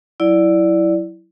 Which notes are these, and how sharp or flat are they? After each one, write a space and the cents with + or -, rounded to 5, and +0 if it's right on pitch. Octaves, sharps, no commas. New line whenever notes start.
F#3 +0 E4 +0 D5 +0